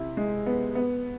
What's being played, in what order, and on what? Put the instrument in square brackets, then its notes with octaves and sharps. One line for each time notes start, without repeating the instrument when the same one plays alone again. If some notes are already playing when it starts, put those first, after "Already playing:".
Already playing: [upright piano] C3 E4
G#3
B3
B3